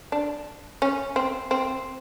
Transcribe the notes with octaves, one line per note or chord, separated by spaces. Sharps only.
D4
C#4
C4
C4